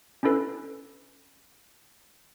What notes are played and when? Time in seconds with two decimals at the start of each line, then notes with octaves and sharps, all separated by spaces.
0.23 C#4 D4 E4 A4 B4